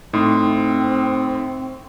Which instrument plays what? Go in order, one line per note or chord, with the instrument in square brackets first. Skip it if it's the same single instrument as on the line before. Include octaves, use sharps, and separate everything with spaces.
[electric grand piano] A2 [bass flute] C4 [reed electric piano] D#4 C6 D#6